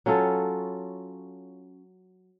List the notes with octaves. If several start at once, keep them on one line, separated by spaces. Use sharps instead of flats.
F#3 C#4 F4 A4